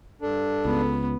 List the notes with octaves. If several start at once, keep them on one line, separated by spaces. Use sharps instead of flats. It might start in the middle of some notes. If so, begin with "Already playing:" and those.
G2 D4 A4
C#2 B3